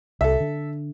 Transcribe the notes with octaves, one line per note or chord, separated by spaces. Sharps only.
C2 A4 E5
D3